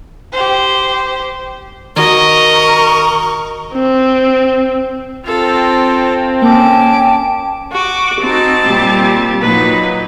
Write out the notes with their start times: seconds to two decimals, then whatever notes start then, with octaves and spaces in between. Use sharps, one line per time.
0.32 G4 C5
1.97 D#3 F#4 A#4 D#5 C#6
3.74 C4
5.25 C4 F4 A4
6.42 A#3 C#4 G5 A5 D6
7.72 F#4 D6
8.21 C4 D#4 F#4 A5
8.66 A#2 G3 G4
9.41 A#2 F#3 D#4 B4